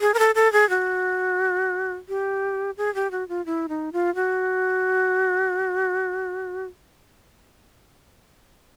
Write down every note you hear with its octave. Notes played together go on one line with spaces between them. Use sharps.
G#4
A#4
A4
A4
G#4
F#4
G4
G#4
G4
F#4
F4
E4
D#4
F4
F#4